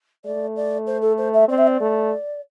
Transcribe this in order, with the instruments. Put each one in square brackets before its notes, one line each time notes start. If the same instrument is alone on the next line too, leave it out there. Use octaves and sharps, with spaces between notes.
[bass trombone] A3 [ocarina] D5
[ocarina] D5
C5
A4
C5
E5
[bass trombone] C4 [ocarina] D5
[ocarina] E5
D5
[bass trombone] A3